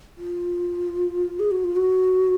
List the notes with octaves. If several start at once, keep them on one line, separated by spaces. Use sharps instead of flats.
F4
G#4
F#4
F4
F#4